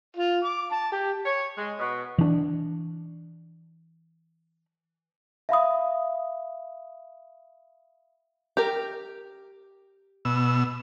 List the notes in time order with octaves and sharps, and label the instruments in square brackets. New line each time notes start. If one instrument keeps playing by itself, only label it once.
[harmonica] F4
D6
A5
G4
[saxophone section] C#5
G#3
B2
[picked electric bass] E3 D4
[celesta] E5 F5 B5 D#6
[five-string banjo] G4 A#4
[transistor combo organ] B2 E6